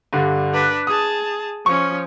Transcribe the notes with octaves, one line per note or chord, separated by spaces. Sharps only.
G2 D3
D4 B4
G#4 A5 D#6
F3 C#4 C#6